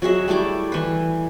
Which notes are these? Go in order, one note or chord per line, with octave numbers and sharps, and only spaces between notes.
F#3 F#4 G#4 E5
G3 A3 E4 D6
E3 B4